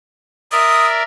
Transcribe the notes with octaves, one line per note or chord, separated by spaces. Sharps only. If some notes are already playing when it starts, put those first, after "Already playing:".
A#4 D5 E5 D#6